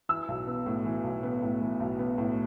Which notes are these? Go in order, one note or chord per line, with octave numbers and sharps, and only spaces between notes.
E3 E6
B1
B3
A2
E3
B1
B3
A2
E3
B1
B3
A2